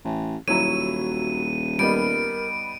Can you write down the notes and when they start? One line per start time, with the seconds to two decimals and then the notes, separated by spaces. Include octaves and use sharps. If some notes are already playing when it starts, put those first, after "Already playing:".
0.05 A1
0.48 D#1 F#3 E4 F#4 A#5 D#7
1.79 G3 B3 D#4 A#4 D7